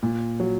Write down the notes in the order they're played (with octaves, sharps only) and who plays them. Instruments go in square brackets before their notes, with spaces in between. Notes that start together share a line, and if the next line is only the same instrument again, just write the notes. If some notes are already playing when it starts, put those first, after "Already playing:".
[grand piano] A#2
F#3